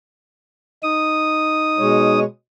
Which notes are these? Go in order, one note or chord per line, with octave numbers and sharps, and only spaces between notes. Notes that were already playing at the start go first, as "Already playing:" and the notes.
D#4 D#6
B2 G#3 C#5